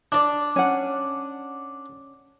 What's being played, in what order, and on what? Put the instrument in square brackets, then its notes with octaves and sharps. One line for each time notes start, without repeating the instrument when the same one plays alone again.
[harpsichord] D4 D5
[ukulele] C#4 F#5